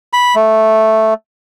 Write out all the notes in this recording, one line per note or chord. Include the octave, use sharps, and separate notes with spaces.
B5
A3